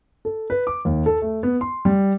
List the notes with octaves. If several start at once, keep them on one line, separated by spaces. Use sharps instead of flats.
A4
B4
D6
D#2
A4
A3
B3
C6
G3